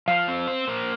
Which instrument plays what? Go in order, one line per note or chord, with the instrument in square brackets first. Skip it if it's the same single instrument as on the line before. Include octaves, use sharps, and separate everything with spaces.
[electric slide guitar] F3 [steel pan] F5
[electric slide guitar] C4
C5
A#3